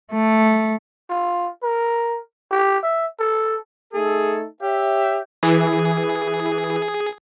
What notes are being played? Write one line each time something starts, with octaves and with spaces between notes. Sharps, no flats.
A3
F4
A#4
G4
E5
A4
A3 D#4 G#4 A4
G4 C#5 E5
E3 G#4